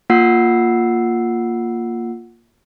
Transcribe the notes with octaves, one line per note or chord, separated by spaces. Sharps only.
A#3 F4 F#5 E6 C7